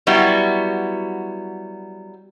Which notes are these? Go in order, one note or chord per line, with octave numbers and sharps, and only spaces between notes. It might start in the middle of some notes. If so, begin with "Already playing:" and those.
F#3 G3 B3 E4 F#4